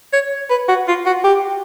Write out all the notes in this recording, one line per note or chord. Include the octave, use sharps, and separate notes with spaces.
C#5
B4
F#4
F4
F#4
G4